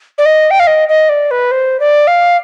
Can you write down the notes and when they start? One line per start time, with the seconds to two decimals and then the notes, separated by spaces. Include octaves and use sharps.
0.18 D5
0.25 D#5
0.51 G5
0.60 F5
0.67 D#5
0.89 D#5
1.09 D5
1.31 B4
1.51 C5
1.80 D5
2.07 F5